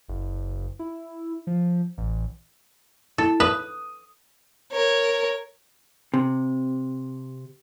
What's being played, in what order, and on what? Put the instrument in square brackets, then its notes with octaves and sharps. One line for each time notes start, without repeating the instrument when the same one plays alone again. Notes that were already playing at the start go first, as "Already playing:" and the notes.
[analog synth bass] F#1
E4
F3
A1
[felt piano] E4 [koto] A4
[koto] B4 [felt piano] D#6
[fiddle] A#4 C#5
[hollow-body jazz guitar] C3